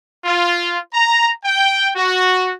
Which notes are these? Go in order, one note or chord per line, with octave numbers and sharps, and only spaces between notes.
F4
A#5
G5
F#4